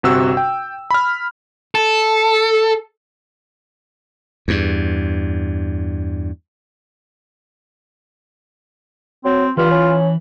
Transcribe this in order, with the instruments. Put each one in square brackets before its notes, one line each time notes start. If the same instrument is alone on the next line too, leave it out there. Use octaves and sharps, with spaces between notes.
[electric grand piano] G1 C3 F#4 E6
G5
B5 F6
[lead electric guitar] A4
[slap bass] E2 G2
[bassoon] F#3 [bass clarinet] C4
[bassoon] G2 [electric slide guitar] E3 B4 [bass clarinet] F4
[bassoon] C#4